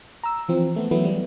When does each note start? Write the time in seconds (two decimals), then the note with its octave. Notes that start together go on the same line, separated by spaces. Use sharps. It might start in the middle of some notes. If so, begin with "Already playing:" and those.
0.23 A#5 E6
0.48 E3 F3 C4
0.76 A3 B3
0.91 E3 F#3 A3 B3 E4
1.05 G3